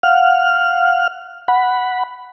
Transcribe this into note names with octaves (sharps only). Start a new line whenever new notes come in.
F5 F#5 F6
F#5 B5